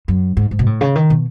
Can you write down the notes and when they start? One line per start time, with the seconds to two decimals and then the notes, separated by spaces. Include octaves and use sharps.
0.08 F#2
0.37 G#2
0.51 G#2
0.59 B2
0.66 A2
0.81 C#3
0.95 D#3
1.10 B2